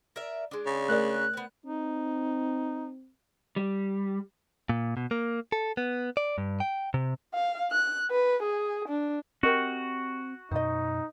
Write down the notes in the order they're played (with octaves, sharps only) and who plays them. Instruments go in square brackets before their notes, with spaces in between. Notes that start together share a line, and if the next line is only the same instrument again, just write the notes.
[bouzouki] A#4 D5 E5
G#3 D4
[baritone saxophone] C#3
[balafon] A3 A#4 D5 [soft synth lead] F#6
[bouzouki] B3 C4
[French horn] C4 [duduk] D#4
[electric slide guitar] G3
[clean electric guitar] A#2
B2
A#3
A4
B3
D5
G2
G5
C3
[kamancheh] F5
F#6
B4
G#4
D4
[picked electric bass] C4 [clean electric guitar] F#4 [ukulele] G4 A#4 D#5
[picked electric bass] F#2 B2 [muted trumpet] D#4 [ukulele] C5 D#5